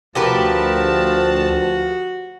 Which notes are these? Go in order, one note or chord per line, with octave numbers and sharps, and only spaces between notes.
D2 F3 F#4 G4 A#4 B4 A5